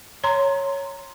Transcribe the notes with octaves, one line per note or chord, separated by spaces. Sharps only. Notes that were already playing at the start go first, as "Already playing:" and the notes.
C#5 A#5 C6